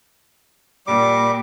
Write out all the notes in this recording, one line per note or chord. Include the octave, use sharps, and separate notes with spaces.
A#2 G3 D6